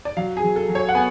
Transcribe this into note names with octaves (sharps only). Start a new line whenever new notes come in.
D5
F#3 F5
G#4
F#3
A4
F#3
C#5
F#5
B3 G#5